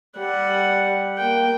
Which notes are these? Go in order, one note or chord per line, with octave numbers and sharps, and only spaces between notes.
G3 F#5
A#3 G5